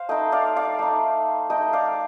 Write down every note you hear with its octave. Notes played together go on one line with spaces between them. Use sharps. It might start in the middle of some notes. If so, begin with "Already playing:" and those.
Already playing: C5 F5
A3 D#4 D#5 G5
D5 F5
D5 F5
A3 D#4
A3 D#4 D#5 G5
D5 F5